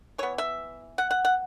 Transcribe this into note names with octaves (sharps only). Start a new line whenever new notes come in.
E3 B3 C#5
E5
F#5
F#5
F#5